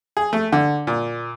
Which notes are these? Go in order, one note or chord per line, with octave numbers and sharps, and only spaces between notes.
G#4
A3
D3
A#2